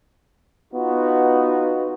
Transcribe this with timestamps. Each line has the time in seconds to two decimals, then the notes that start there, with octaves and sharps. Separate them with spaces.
0.73 B3 D#4 F4 F#4